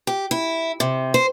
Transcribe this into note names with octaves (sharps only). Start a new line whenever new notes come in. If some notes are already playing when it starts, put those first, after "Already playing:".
G4
E4
C3
C5